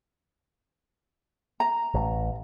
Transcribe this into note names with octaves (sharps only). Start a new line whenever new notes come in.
A#5
A1